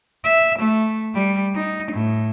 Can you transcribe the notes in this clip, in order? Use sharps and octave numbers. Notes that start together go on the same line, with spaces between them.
E5
A3
G3
D#4
A2